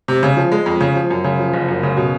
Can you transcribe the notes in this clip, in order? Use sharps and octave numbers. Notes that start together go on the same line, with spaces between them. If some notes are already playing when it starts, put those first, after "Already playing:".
C3
C#3
F3
G#3
F2
C#3
F3
F#2
C#3
F3
F#1
F#2
C#3
B2